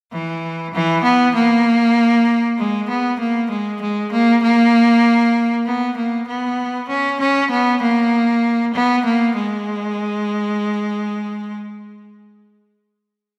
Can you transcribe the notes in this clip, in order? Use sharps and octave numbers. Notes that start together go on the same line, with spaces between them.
E3
E3
B3
A#3
G#3
B3
A#3
G#3
G#3
A#3
A#3
B3
A#3
B3
C#4
C#4
B3
A#3
B3
A#3
G#3